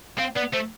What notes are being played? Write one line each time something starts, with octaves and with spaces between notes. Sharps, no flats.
C4 F5
B3 D5
A3 C5